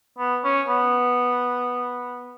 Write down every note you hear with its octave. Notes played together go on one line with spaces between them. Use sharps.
B3
C#4
B3